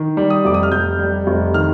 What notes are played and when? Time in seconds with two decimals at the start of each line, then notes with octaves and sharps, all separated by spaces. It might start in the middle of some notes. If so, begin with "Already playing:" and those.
Already playing: D#3
0.17 G3
0.30 D#6
0.45 F1 D6
0.54 D#6
0.63 F6
0.72 F1 G6
0.99 G3
1.27 F1
1.54 D#3 F6